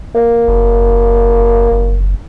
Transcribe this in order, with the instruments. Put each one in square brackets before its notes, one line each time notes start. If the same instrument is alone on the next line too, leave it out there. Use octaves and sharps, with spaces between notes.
[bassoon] A#3
[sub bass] F#1
F#1